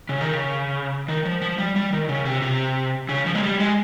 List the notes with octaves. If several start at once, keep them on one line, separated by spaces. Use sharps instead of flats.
C#3
D#3
C#3
D#3
F3
F3
G3
G3
D#3
C#3
C3
C3
C#3
F3
G#3
G3
G#3